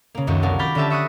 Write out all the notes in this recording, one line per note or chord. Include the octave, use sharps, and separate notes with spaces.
C#3 A#3
C#2 F#2 D#3
C2 F3 F#3 A#4 A5
B5 D6 F6 G6 A6 A#6
D3 C#4 G4 E5 A5
E5 C#6 D#6 F#6 A#6